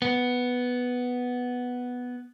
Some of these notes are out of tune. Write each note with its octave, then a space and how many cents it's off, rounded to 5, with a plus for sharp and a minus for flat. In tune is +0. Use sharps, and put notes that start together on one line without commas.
B3 +0